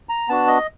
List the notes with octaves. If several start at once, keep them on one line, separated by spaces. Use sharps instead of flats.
A#5
B3 D4 F#4 A5
D#5